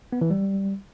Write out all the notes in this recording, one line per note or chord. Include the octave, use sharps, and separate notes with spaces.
B3
E3
G3